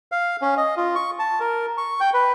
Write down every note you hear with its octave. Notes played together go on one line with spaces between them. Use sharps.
F5
C#4
D#5
F4
C#6
A5
A#4
C#6
G5
B4